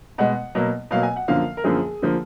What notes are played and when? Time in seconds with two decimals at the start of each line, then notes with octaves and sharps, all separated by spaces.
0.18 B2 G#3 F#5
0.55 B2 F#3 A#3
0.91 B2 F#3 A#3 F5
1.03 G#5
1.16 F#5
1.28 F#2 D3 F3 A#3 F5
1.57 A#4
1.64 F#2 D3 F3 A#3 G#4
2.02 D3 F3 A#3